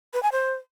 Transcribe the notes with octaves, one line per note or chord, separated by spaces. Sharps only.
B4
G#5
C5